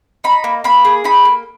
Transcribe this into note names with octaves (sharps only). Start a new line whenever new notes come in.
D#4 B5
A#3
A#3 B5
G#4
D#4 B5
A#3